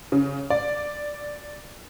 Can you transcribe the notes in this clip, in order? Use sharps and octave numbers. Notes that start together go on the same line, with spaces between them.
C#3
D5